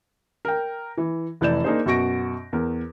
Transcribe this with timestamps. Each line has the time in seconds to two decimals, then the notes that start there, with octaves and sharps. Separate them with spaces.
0.45 A#4 G5
0.98 E3
1.41 F1 E3 D5 G6 E7
1.64 A#3 D4 D#4 G#4 A#4 C5
1.86 F#2 B2 F#4 C#6 A#6 D7
2.53 E2 A#4